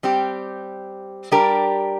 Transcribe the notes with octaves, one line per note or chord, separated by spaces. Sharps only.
G3 C4 G4
G3 D4 G4 A#4